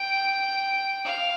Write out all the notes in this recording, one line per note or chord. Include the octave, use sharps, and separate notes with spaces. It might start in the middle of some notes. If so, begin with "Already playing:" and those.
Already playing: G5
F5